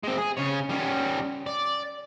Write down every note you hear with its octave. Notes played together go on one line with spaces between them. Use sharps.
G#3 C4
G#4
C#3 C#5
G3 C#4
D5